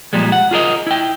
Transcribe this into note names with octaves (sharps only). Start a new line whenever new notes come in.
A#2 F3 G3 G#3
F#5
F4 G#4 A#4 D#5
E4 G5